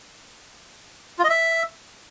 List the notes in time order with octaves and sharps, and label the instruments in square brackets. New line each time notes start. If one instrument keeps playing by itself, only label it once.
[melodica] F4
D#5
E5